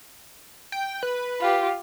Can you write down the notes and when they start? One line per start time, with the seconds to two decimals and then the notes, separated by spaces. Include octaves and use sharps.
0.72 G5
1.03 B4
1.41 F4 G4